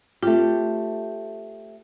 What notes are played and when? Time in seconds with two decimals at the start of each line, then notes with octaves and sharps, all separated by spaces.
0.23 A3 C4 F4 G4